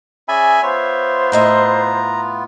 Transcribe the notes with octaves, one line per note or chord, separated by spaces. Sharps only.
C#4 G#4 D5 E5 G#5 B5
B3 F4 C5 C#5 E5
A2 D#5 E5 A#5